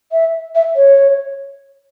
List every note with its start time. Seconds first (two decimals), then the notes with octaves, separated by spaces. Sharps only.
0.11 E5
0.54 E5
0.75 C#5